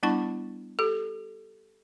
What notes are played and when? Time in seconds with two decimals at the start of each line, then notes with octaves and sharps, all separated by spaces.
0.03 G3 B3 D4 E4 A5 C#6
0.79 G4 A4